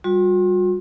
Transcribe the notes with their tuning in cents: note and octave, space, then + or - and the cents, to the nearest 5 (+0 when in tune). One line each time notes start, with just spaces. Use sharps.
G3 +0 F#4 -40 C6 +35